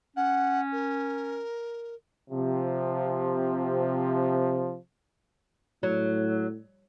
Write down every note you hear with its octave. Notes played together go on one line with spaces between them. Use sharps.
C#4 F#5
A#4
C3 F3
A2 F#3